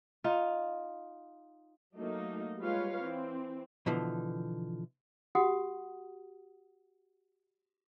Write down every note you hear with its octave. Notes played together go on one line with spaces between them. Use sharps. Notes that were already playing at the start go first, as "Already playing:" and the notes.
D#4 F4
F#3 A3 A#3 D#4
G3 G#3 F4 B4 C#5 F5
E3 C4
B2 D3 E3 F3
F#4 G4 F#5 D#6